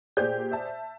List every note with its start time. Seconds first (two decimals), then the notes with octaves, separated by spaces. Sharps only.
0.17 A#2 G4 G#4 C5 D5 G6
0.52 E5 A5